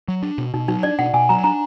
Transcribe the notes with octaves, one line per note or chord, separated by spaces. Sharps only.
F#3
D4
B2
B2 D#4
F#3 D#4
D4 D5
B2 F#5
B2 G#5
F#3 A#5
D4 A#5